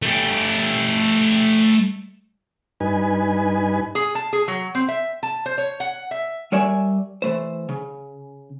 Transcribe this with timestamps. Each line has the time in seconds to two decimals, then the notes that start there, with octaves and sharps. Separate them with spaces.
0.02 A3 G4
2.80 G2 D#4 B4 G#5
3.95 G#4
4.15 A5
4.33 G#4
4.48 F#3
4.75 C4
4.88 E5
5.23 A5
5.46 C5
5.58 C#5
5.80 F#5
6.11 E5
6.52 G3 A#4 C#5 D5 E5 G#5
7.22 E3 A3 C5
7.69 C#3